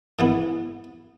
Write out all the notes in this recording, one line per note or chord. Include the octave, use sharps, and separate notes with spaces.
G#2 E3 B3